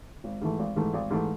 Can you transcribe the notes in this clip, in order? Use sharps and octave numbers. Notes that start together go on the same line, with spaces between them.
G#1
G#2 E3 A3
G#1
G#2 E3 A3
G#1
G#2 E3 A3